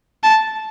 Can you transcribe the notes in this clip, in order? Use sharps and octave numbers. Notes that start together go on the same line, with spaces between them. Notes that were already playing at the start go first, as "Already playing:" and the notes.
A5